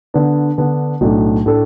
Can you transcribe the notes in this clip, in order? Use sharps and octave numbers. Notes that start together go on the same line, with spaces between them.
D3 B3 D4
D3 B3 D4
B1 A2 A3 D4 A4
A2 A3 D4 A4